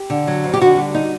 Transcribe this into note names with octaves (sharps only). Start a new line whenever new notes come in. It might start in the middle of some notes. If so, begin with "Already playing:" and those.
Already playing: G4
D3
F#3
F2
G4
D3 F#4
G3
D#4